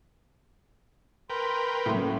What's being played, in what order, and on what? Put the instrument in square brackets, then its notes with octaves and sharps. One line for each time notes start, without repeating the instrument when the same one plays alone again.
[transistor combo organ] A#4 B4 G5 [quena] C6
[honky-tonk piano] A2 [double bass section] F#3 A#3 C#4 [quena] C6